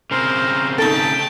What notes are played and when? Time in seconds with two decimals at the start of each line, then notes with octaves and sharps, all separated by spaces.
0.11 C#3 C4 A#4 C5
0.78 A3 D#4 A4 G5 A5